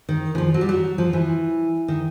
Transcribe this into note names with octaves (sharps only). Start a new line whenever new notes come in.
D#3
E3
F3
F#3
G3
F#3
F3
E3
D#3